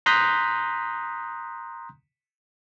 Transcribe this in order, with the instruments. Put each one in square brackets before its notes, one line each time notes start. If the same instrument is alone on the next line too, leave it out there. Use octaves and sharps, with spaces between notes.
[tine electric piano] A#5 C6 D#6 F#6 G6 B6